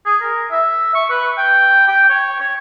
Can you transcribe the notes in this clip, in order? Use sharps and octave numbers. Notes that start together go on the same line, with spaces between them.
G#4
A#4
E5
C#6
B4
G5
G5
C#5
C#5